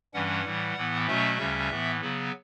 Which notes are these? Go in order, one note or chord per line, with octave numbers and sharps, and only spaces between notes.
G2 E3 G3 C#4 F#5
A2 E3 G3
A2 E3 B3
B2 F#3 A3 C#4 E5
D2 C#3 G3 C#4
A2 E3 B3
C#3 F#3 B3